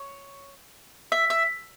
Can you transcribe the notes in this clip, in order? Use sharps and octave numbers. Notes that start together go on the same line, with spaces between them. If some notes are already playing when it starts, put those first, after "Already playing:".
Already playing: C#5
E5
E5